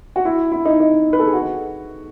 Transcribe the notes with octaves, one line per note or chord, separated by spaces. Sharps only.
F#4
E4
E4
D#4
D#4
B4
A4
G#4
F#4